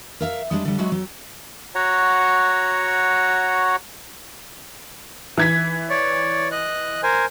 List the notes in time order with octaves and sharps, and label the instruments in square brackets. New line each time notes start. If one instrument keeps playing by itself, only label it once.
[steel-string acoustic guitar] A#4 E5 F5
G3 G#3 D4
D3 G3
F#3 G#3 F#4 E5
F#3
[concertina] F#4 C#5 F#5 A#5
[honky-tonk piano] E3 G#6 B6
[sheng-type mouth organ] C#5 D5
D#5 F#6
A#4 C5 G#5